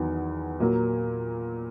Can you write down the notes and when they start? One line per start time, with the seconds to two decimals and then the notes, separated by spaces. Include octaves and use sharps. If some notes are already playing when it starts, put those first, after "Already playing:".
Already playing: E2 D#3 F#3 B3
0.60 A#2 F#3 A#3